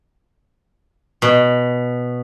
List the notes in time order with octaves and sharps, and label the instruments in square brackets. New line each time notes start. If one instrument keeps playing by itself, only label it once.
[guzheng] B2